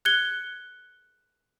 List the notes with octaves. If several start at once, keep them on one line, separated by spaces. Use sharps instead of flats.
F#6 G#6 C#7 G7